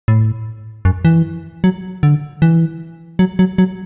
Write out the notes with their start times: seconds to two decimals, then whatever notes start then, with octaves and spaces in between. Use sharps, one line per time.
0.08 A2
0.85 F#2
1.05 E3
1.64 F#3
2.03 D3
2.42 E3
3.19 F#3
3.39 F#3
3.58 F#3